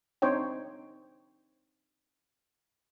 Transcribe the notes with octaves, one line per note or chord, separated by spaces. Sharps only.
C4 D4 D#4 C5 C#5 G5